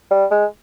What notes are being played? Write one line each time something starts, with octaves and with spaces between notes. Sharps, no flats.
G3
G#3